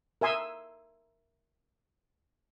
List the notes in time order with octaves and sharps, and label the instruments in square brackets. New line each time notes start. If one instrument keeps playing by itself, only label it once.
[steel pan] A#4 E5 G#5 C6 D#6 E6